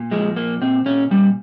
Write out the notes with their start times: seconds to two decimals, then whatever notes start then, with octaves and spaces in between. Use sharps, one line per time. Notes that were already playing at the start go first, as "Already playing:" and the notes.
Already playing: A#2
0.11 F3 G#3
0.36 A#2 A#3
0.61 A#2 C4
0.86 A#2 C#4
1.10 A#2 G3